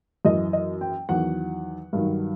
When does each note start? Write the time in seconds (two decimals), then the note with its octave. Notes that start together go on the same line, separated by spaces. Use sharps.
0.25 F#2 E3 D#5
0.53 D#5
0.81 G5
1.09 E2 D#3 F#3 F#5
1.93 G2 D#3 F#3